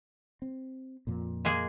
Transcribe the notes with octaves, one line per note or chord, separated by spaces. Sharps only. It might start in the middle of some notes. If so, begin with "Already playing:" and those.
C4
F2 A#2
G#3 A#3 G#4